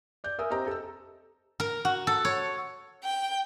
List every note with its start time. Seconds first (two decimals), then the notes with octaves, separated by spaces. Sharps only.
0.24 D5 G6
0.39 A#4 E5 G#5 D#6 E6
0.50 C4 G4 D#5 A#5
0.67 A4 E6
1.60 A#4
1.85 F#4
2.07 A4
2.25 C#5
3.04 G5